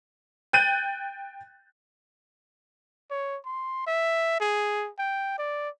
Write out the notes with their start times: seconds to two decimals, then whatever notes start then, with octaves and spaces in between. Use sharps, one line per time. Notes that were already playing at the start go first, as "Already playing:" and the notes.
0.53 G5 F#6 G6 A6 D#7
3.10 C#5
3.45 C6
3.87 E5
4.40 G#4
4.98 G5
5.38 D5